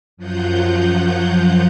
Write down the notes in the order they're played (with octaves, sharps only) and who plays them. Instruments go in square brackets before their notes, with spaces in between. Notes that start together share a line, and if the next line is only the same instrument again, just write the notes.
[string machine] F#2 F3 F#3 F4 F#5 G6